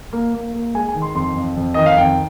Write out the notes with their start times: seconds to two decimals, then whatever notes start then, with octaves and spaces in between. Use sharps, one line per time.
0.13 A#3
0.34 A#3
0.54 A#3
0.74 G#3 G#5
0.89 G#5
0.94 D#3
1.02 C6
1.15 F2 C6
1.36 F2
1.56 F2
1.74 D#3 D#5
1.86 F5
1.97 F2 G5